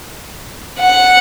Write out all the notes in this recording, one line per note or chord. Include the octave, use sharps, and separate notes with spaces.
F#5